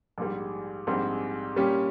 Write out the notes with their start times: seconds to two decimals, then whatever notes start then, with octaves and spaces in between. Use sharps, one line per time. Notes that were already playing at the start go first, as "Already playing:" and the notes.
0.18 A#1 G#2 G3
0.87 A#1 G#2 G3 C4
1.56 A#2 G3 C#4 G4